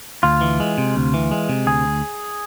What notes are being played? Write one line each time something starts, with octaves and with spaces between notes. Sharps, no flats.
D2 F4
E3
G#3
C3
D2
E3
G#3
C3
D2 G#4